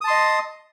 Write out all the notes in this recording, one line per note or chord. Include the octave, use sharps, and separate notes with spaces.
D#5 A5 C6 D#6